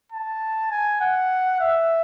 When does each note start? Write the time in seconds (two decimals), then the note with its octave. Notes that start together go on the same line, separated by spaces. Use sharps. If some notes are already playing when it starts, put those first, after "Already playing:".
0.12 A5
0.71 G#5
1.01 F#5
1.60 E5